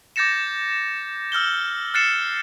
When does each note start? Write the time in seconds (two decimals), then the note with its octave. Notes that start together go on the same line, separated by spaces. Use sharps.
0.16 D6 G6 A6 A#6 C#7 E7
1.32 E6 F6 G6 G7
1.94 F6 F#6 A6 C7 C#7 E7